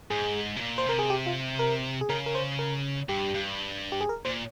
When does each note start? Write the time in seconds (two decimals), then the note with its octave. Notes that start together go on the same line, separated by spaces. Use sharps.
0.10 G#2 G#4
0.56 C3
0.60 A#2
0.78 C5
0.86 C3 A#4
0.99 G#4
1.10 G4
1.26 F4
1.59 A#4
2.01 G#4
2.09 C#3 A#4
2.26 A#4
2.35 C5
2.59 A#4
3.09 G2 G4
3.34 G2
3.92 G4
4.01 G#4
4.09 A#4
4.25 A#2 C5